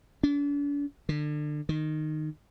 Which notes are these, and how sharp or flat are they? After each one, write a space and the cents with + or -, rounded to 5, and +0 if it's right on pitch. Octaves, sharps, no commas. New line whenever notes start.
D4 -40
D3 +30
D#3 -15